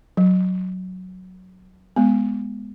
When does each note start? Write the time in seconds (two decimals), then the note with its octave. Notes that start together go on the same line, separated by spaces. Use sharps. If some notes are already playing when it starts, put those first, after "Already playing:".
0.17 F#3
1.96 G#3 B3